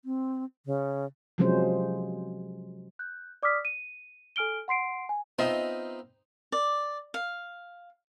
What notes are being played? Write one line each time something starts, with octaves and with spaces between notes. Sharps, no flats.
C4
C#3
C3 F3 F#3 G#3 C#4 C5
F#6 G6
D5 D6 D#6 F6 B6
D#7
A4 G#5 F6 D7 G7
F#5 C6 C7 D7
G#5
B3 C4 D#4 F4 D#5 E5
D5
F5